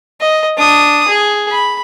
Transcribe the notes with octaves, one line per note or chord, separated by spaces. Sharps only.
D#5
D4 D#6
G#4
B5